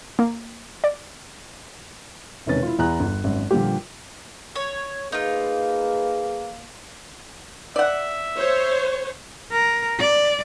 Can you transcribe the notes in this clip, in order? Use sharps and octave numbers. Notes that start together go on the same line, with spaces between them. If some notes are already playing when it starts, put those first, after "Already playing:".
A#3
D5
E1 C3 D#3 C#4 B4 A6
E4 F4
E2 A#5 F#6
G1
G#1 F#2
A#2 D3 F3 G3 A#3 G4
C#5
A#3 D#4 F4 G#4 B4
D5 E5 F#5
C5 C#5
A#4
D5